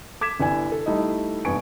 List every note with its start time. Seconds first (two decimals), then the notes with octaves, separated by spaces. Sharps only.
0.21 D6 G#6 B6 E7
0.40 G1 E4 D5 G#5
0.72 A4
0.86 G3 A3 D#4 E4 D#5
1.45 F1 G2 B3 G#5 C#6 D7